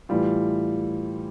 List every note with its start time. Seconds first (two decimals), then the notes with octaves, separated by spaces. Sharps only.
0.09 A2 E3 G3 F4